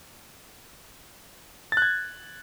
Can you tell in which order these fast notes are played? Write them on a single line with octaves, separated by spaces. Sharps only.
A6 F#6 G#6